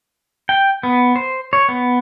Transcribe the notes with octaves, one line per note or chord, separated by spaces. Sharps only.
G5
B3
C5
C#5
B3